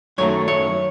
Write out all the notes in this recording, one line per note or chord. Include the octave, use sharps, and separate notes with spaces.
F#2 D#3 F#3 A3 C#5
C#5